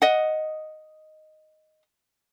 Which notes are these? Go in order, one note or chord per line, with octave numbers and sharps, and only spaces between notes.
D#5 F#5